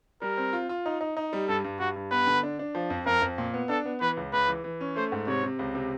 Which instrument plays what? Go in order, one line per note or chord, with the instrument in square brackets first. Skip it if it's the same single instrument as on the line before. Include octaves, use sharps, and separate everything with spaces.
[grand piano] G3 [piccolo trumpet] A#4
[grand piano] C4
F4
F4
D#4
D#4
D#4
G3
[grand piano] G2 [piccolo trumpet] A4
[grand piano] G2
[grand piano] G2 [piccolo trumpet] F#4
[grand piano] G2
[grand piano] B3 [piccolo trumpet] B4
[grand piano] D3
D4
D4
F3
F2
[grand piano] F2 [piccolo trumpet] A#4
[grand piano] F2
A#2
B3
[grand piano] D4 [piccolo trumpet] A4
[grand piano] B3
[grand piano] E3 [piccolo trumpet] B4
[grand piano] C#2
[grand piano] C#2 [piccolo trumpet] B4
[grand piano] E3
E3
C#4
[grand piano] A3 [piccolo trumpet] C5
[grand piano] G#2
[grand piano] C3 [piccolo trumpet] C#5
[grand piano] C3
C#2
C3